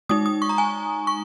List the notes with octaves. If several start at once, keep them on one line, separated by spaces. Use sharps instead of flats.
G#3 D#4 D#6
D#6
C#6
A#5
G#5
C#6